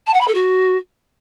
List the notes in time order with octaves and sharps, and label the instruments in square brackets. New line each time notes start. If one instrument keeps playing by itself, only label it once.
[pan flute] A5
F#5
B5
A4
F#4